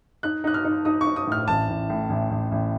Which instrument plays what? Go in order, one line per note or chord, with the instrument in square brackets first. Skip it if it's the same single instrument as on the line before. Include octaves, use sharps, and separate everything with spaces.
[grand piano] D#4 [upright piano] F#6
[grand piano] D#4 [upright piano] F#6
[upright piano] F6
[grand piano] D#4
[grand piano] D#4 [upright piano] D#6
[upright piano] C#6
[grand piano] D#4
[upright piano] D#6
[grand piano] A2 [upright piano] F6
[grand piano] A1 [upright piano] A5
[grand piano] A1
A2
A1
A1
A1